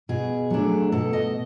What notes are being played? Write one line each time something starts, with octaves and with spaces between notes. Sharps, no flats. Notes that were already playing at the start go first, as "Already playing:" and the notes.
B2 G#4
F#3 A3 D4
B2 A4
D#5